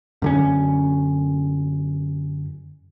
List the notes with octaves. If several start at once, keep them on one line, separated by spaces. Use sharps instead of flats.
F#2 D3 C#4